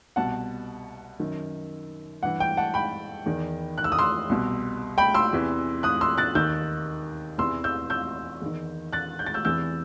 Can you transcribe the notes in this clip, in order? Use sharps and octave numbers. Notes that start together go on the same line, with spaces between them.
C2 B2 F#5 A5
F#2 D#3
G2 E3 F#5
G5
F#5 A5
G5 B5
E2 D#3
F#6
E6
D#6
C6 E6
C2 B2
G5 B5
C6 E6
E2 C3 E3
D#6 F#6
C6 E6
F#6 A6
D#2 D#3 E6 G6
E2 C3 E3 C6 E6
E6 G6
E6 G6
E2 D#3
F#6 A6
G6
A6
E6 G6
E2 C3 E3 E6 G6